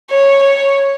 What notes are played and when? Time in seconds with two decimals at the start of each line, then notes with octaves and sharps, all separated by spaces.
0.10 C#5
0.43 C#5